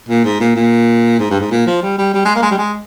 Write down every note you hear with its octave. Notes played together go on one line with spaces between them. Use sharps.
A#2
G#2
A#2
A#2
G#2
G2
G#2
A#2
F3
G3
G3
G3
G#3
A#3
G#3
G3
G#3